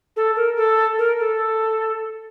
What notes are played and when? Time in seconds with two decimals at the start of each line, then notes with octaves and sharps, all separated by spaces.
0.16 A4
0.36 A#4
0.56 A4
0.98 A#4
1.19 A4